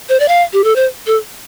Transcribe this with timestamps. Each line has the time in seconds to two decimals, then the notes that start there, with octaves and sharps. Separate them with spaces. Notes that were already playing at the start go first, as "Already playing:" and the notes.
0.09 C5
0.20 D5
0.28 F5
0.53 G4
0.64 A4
0.76 C5
1.07 A4